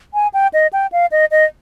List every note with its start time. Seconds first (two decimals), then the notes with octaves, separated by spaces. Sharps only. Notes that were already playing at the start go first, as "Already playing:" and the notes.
0.14 G#5
0.34 G5
0.53 D#5
0.73 G5
0.92 F5
1.12 D#5
1.31 D#5